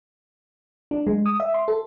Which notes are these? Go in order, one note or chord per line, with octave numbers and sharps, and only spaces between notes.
D4
G#3
D#6
E5
C6
A4